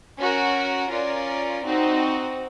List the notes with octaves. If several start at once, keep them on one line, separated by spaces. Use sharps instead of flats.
C#4 F#4 A#4
C#4 F4 A#4 D5
C4 D#4 F#4